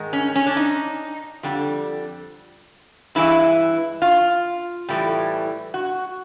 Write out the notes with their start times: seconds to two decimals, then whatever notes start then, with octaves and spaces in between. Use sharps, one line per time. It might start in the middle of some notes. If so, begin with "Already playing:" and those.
Already playing: G#2 D#3 G#3
0.13 C#4
0.36 C#4
0.46 D4
0.57 D#4
1.43 F2 D3 G3
3.15 G2 E3 G#3 E4
4.02 F4
4.89 A2 E3 G3
5.74 F#4